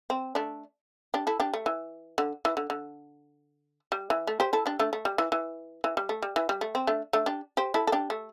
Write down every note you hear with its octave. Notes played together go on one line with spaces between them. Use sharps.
C4
A3 D4
D4 G4
E4 A4
D4 G4
A3
E3
D3
E3
D3
D3
G3
E3
A3
G4 C5
E4 A4
D4 G4
A3 D4
A3
G3
E3
E3
E3
G3
A3
G3
E3
G3
A3
C4
A3 D4
A3 D4
D4 G4
G4 C5
E4 A4
A4
D4 G4
A3